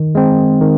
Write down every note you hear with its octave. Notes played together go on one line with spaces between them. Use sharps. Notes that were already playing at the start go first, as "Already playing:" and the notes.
Already playing: D#3
G#3 C4
D#3